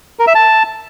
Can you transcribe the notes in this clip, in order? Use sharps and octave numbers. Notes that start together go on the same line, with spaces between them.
A#4
E5
A5